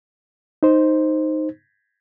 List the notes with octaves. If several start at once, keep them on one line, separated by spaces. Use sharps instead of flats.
D#4 C5